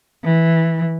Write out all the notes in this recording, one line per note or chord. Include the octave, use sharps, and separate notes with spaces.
E3